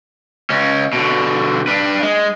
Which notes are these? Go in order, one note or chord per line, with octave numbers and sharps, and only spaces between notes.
C#2 C#4
B2 D3
D4 B4
G#3